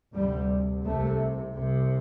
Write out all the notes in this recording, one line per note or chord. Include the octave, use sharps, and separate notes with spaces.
D2 C3 G3
C2 C3 A3
C2 C3